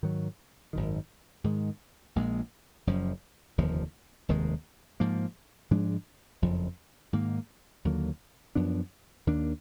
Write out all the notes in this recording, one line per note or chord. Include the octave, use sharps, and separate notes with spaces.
G#2 D#3 F#3
G#1 F#2 D#3
G#2 D#3 G#3
A#1 A#2 G#3
F#1 F#2 F3
F1 D#2 D3 F3
F1 D#2 D#3 G#3
G#2 F3 A#3
G#2 F3 G#3 D4
F#1 F2 F3
G#2 D#3 A#3
D#2 D3 F#3 A#3
F#2 F3 B3 D4
D#2 D#3 A#3 D4